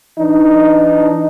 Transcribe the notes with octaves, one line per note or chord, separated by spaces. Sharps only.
E3 D4 D#4